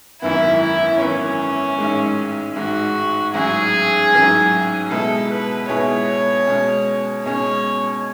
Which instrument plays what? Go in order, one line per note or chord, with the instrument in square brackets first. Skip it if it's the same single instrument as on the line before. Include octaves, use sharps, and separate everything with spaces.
[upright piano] G#1 F#2 E3 B3 [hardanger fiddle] E4
[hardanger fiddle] E4
[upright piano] G#1 F#2 E3 B3 [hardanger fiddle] C#4
[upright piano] A1 G#2 G#3
[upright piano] A1 G#2 G#3 [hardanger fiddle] F#4
[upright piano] A1 G#2 F#3 C#4 [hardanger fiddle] G#4
[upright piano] A1 G#2 F#3 C#4
[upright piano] B2 G#3 B3 E4 G#4 [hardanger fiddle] A4
[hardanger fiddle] B4
[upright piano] B2 G#3 B3 E4 G#4 [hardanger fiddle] C#5
[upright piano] B2 G#3 C#4
[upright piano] B2 G#3 C#4 [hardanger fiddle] C#5